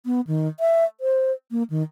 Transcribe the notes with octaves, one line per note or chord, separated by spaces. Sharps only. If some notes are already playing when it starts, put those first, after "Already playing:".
B3
D#3
E5
C5
A#3
D#3